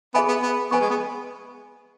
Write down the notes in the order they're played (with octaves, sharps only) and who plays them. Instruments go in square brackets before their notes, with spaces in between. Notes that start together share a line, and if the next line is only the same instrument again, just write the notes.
[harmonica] B3 [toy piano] G#4 E5 G#5 B5
[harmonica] B3
B3
[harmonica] B3 [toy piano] B4 G#5 C#6
[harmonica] G#3
B3